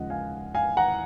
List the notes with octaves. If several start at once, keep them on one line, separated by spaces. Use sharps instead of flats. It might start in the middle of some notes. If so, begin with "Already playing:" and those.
Already playing: D#2 C#3 F3 G#3 D#5 F#5
F5 G#5
F5 G#5
F#5 A#5